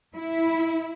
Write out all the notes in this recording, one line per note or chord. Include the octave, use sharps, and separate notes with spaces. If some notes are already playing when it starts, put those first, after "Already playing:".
E4